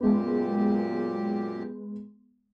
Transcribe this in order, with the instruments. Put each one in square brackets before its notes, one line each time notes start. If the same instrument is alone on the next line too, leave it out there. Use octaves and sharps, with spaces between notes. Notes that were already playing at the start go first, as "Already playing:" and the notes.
[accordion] F#2 A#2 G4 [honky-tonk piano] G#3 B3